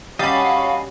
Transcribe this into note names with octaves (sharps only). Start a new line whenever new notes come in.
G3 C#4 F#4 D#5 F5 A5 B5